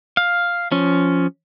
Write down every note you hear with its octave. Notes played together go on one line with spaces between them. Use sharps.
F5
F3 C#4